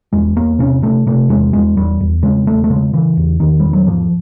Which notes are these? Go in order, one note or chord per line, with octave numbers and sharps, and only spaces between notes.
E2 G#3
E2 A#3
C3 C#4
C3 A3
C3 A3
E2 G#3
E2 G#3
E2 G3
E2
C#3 G#3
E2 A3
A3
C#3 G#3
C#3 E3
E2
E2 D#3
E2 G3
F#3
G#2 F3